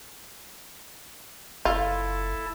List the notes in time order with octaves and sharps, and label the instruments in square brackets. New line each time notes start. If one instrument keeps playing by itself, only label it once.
[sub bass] F#1 [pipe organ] E4 A4 A5 [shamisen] F4